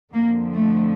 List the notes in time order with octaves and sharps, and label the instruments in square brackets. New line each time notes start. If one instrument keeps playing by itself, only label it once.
[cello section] F2 D3 F3 A#3
A3